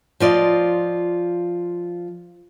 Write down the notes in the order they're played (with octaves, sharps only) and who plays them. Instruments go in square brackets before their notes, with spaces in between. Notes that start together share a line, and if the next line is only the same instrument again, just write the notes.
[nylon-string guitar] F3 F4 D5 D#5